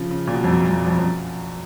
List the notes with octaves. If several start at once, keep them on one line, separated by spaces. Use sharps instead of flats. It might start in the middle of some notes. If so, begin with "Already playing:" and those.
Already playing: C#3 F3
C#3
A#2
B2
F2
F#2
F#2
F2
F2
F2
F#2